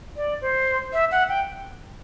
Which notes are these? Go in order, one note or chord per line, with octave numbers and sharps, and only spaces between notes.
D5
C5
E5
F#5
G5